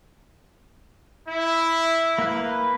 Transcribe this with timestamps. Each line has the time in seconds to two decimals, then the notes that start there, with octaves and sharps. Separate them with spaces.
1.27 E4
2.18 A#3 B4